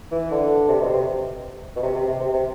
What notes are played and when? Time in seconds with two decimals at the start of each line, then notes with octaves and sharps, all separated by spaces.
0.12 E3
0.31 D3
0.68 C3
0.81 B2
0.93 C3
1.76 B2
1.83 C3
1.96 C3
2.08 C3
2.21 C3
2.33 C3